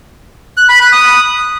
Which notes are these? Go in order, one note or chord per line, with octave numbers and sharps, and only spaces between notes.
F#6
B5
F#6
D#6